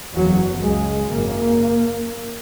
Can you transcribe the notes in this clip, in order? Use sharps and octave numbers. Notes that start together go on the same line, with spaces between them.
F#1 E2 C#3 F#3
C#2 C#3 G#3
G#1 F#2 C#3 A#3